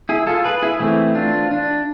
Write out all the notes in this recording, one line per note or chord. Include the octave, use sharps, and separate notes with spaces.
E4 G#4
F4 A4
G#4 B4
E4 G#4
E3 A3 C4 E4
D4 F4
D4